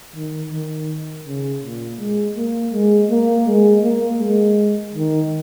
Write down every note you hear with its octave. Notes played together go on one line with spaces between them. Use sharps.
D#3
D#3
C#3
A#2
G#3
A#3
G#3
A#3
G#3
A#3
G#3
D#3